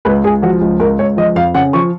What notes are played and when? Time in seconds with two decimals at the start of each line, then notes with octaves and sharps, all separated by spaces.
0.05 C#2 B4
0.24 C#2 G#4
0.42 F3 F#4
0.61 C#2
0.80 C#2 A#4
0.99 C#2 C#5
1.17 F3 D#5
1.35 F2 F5
1.54 C#3 F#5
1.73 F3 C#6